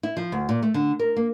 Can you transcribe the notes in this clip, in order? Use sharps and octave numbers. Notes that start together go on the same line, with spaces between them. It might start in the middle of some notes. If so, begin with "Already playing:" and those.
E4
F3
D2
A#2
A3
D3
A#4
A#3